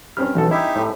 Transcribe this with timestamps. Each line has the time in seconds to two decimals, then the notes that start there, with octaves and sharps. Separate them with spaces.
0.17 G2 C4 C#4 F6
0.35 B1 E3 A4
0.51 D#4 E4 G4 D#5 E5
0.76 A2